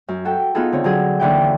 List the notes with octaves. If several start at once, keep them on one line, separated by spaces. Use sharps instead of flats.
F#2
F#4 A4 G5
B3 D#4 F4 G#4 A4
D3 C4 C#5
D3 F#3 G#4
D#2 D3 E3 G5